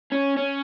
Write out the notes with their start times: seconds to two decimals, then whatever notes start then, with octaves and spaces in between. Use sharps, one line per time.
0.12 C#4
0.37 C#4